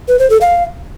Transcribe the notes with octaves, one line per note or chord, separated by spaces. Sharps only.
B4
C5
A4
F5